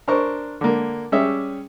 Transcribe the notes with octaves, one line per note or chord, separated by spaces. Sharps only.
D4 A#4 C5 C#6
D3 A#3
G3 C#4 G4 G#4 E5